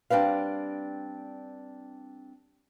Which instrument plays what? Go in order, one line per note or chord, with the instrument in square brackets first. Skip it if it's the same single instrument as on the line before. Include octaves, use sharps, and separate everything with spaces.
[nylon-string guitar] G3 C4 D4 B4 F5